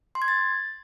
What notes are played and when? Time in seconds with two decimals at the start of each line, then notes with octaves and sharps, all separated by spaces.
0.15 C6
0.22 G#6
0.28 A6